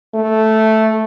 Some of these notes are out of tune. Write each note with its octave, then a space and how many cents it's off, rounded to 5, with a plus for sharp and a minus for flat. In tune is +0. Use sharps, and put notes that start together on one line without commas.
A3 -5